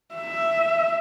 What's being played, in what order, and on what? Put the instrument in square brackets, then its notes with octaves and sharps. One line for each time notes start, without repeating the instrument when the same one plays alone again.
[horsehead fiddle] E5